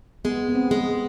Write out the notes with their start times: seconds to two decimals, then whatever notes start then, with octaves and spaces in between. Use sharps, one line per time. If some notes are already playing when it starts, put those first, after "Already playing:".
0.24 G#3 B3
0.48 B3
0.55 C4
0.71 G#3
0.87 B3